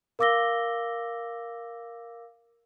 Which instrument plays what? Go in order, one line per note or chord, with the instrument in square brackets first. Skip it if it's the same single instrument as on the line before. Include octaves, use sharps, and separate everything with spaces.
[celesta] A#4 F5 D6 E6 A#6 G7